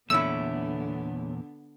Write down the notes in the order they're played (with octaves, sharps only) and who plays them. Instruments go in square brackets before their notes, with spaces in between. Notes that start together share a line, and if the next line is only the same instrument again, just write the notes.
[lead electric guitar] E2 A#2 [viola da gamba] D3 B3 [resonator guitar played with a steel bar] A3 C#4 E4 [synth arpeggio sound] E6